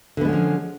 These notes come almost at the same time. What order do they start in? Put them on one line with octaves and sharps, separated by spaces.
D3 B3 G#3 C#4 F3